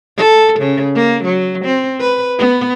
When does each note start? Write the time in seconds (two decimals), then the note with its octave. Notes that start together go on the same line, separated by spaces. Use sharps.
0.17 A4
0.60 C#3
0.96 A#3
1.24 F#3
1.65 C4
2.01 B4
2.38 B3